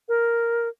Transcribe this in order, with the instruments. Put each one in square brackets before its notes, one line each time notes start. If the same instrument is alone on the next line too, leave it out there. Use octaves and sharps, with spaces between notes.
[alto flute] A#4